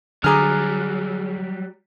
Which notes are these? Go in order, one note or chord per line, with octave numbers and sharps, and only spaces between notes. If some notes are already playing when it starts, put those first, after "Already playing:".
D3 F#3 G3 G#4 G#5 A#5 D6 F6